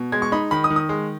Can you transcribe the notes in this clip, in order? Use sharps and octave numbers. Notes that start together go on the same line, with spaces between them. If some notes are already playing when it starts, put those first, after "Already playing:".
Already playing: B2
G#3 G#6
C#6
D#4 B5
D#3 B5
D#6
D#3
D#6
G#3